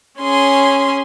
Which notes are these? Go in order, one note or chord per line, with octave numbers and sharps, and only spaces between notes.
C#4 G#4 C6